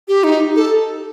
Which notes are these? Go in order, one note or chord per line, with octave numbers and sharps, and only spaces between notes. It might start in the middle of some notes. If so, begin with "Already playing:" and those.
G4
D#4
A4